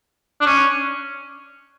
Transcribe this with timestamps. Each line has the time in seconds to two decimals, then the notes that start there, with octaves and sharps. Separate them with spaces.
0.41 D4
0.46 C#4